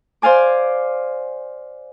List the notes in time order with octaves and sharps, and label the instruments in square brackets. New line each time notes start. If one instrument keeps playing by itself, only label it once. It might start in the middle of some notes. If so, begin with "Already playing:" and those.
[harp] C5 D5 F5 G#5 D6